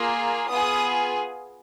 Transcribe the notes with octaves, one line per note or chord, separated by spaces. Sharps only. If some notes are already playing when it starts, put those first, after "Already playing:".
Already playing: A#3 F4 G#4
B3 F4 G#4 D#6